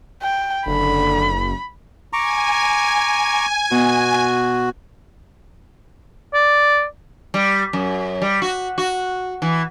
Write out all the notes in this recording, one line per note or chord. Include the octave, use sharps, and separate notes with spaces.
G5
F#1 D3 B5
G#5 A#5 C#6 D6
B2 F#4
D5
G3
F#2
G3
F#4
F#4
E3